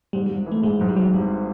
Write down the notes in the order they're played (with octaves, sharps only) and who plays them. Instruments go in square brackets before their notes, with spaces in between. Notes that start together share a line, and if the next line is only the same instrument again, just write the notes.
[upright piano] G#2 [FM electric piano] G3
[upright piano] G#1 [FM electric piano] G3
[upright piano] E3
[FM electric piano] A3
[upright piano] G#2 [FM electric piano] G#3
[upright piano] G#2 [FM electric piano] F#3
[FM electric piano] G3
[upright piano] G#2 [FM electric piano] F#3
[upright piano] G#1 [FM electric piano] G3